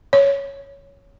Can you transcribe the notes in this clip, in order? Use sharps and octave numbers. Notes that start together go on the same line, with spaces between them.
C#5